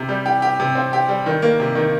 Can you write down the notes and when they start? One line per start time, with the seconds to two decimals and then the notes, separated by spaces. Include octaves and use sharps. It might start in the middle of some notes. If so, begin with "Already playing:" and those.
Already playing: C3
0.09 G3
0.26 G4
0.42 G4
0.60 C3
0.75 C4
0.93 G4
1.08 G3
1.26 D#3
1.42 A#3
1.60 C3
1.75 D#3